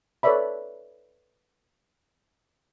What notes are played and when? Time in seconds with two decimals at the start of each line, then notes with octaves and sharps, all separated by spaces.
0.23 A4 B4 C#5 D5 E5 B5